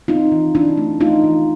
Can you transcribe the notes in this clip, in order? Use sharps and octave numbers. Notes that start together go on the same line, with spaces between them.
C4 D#4 F4
E3
E3 D4 E4
A3
A3 D#4 F4
E3